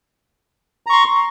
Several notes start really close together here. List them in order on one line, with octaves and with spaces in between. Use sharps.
A#5 C#6 C6